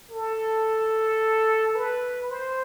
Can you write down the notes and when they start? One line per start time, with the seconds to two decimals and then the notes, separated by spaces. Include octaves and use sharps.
0.11 A4
1.75 B4
2.31 C5